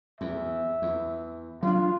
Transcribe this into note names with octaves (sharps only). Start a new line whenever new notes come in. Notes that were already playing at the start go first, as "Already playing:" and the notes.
E2 E5
E2
F#3 D4 F4